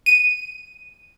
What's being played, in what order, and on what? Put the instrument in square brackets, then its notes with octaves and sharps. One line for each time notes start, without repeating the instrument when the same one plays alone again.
[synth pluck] D#7